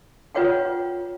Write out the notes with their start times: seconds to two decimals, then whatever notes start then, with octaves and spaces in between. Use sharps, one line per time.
0.35 F4 B4 C#5 F#5 G5